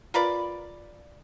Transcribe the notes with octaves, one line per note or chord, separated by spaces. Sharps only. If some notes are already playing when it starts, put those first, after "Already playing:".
F4 A#4 B4 D5